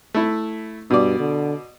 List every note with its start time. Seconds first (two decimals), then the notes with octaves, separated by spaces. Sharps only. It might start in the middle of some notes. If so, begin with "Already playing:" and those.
0.14 A3 E4
0.90 G2 B2 D5
1.19 D3